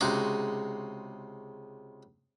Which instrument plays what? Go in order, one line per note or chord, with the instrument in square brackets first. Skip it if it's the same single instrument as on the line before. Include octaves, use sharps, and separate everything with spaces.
[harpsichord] C#2 C3 G#3 D#4 F#4 D6